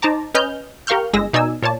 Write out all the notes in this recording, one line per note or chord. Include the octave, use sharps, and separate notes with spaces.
D#4 C5 A5 A#5 D6
C#4 B4 D#5 G#5 F6 G6
G4 A#4 F5 C#6 F6 G6
G1 G#3 G#4 E6 A#6
B2 D#4 D5 G#5 E6
A#2 C#5 D5 A5